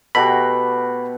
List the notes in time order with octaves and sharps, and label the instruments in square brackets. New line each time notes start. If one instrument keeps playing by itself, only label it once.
[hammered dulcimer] B2 [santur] A3 F#4 G4 [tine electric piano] B5